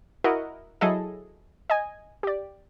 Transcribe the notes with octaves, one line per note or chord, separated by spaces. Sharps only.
E4 F#4 A#4 D#5 F#5
F#3 E4 G#4 A4 D#5
D#5 G#5
G4 D5